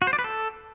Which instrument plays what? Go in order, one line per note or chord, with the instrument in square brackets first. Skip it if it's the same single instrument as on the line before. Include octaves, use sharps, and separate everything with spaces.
[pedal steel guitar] F#4
C5
D5
B4
A4